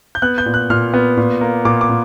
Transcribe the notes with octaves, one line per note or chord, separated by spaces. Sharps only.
G6
B3 F#6
G6
A#2
F#6
A#2 F6
B3
A#2
A#3
A#2 D6
D6
A#2